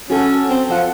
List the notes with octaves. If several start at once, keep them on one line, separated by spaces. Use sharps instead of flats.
C#4 F#4 A4
C4
F3 F#5